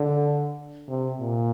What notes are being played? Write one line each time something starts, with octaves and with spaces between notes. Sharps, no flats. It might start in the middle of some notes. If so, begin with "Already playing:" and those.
Already playing: D3
C3
A#2